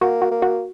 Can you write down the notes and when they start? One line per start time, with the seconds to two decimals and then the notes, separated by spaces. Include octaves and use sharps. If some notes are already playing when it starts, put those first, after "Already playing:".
0.01 A#3 F#4
0.22 F#4
0.31 A#3
0.42 F#4